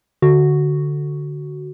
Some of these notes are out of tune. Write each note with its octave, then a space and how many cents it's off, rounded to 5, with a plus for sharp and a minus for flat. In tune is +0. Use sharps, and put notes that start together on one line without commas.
D3 +0 F#4 +0